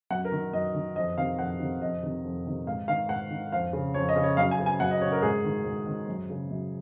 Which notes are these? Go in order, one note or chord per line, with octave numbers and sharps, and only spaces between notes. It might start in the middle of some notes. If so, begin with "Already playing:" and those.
F#2 F#5
A#4
D#3
F#2 D#5
D#3
F2 D#5
C3 D#3 F5
F2 F#5
C3 D#3
F2 D#5
C3 D#3
F2
C3 D#3
G#2 F5
D#3 F5
G#2 F#5
D#3
F2 F5
C#3
F2 C#5
D#5
C#3
C#5
F#2 F5
G#5
C#3
G#5
F#2 F#5
D#5
C#3 C#5
A#4
G#2 G#4
D#3
G#2
D#3
F#2
C#3
F#2